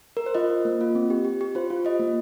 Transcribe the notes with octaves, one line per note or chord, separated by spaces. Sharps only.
A#4
C5
F4 D#5
F4
A#3
F4
C4
G4
G4
G4
F4 C5
F4
F4 D#5
A#3